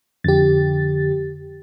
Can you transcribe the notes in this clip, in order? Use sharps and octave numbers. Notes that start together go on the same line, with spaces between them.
F2 D3 G4 A6